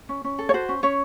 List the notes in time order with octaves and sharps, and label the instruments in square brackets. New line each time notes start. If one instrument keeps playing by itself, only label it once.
[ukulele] C#4
C#4
A4
C#5
F#4 C5
C#4
C#4 C#5